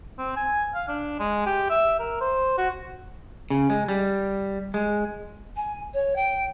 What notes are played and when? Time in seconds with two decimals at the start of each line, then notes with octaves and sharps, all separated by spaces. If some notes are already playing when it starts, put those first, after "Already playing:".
0.18 C4
0.37 G#5
0.75 F5
0.88 D4
1.20 G#3
1.46 G4
1.70 E5
2.00 A#4
2.21 C5
2.58 F#4
3.50 C#3
3.70 G#3
3.88 G3
4.74 G#3
5.56 G#5
5.94 C#5
6.16 G5